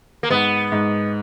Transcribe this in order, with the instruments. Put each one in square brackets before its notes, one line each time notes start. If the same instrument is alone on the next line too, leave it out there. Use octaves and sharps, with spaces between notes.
[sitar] A#3
[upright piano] G#2 [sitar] B3
[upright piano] G#2